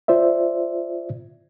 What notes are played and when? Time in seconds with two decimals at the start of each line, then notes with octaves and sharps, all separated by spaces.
0.08 F4 C5 D5 E5